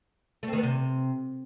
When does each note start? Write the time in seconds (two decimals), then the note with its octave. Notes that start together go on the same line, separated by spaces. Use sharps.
0.43 A3
0.48 C4
0.53 D#3
0.58 B3
0.63 C3